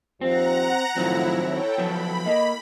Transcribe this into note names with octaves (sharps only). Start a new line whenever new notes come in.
D#2 F3 C4 F#5 A#5 A#6
A2 D#3 F3 F#3 C4 E4
A4 C#5 G5
F3 F#3 B3 B5
A#3 D#5